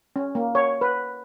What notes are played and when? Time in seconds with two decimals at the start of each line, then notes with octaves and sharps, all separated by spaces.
0.16 C#4
0.35 A#3
0.55 C#5
0.81 B4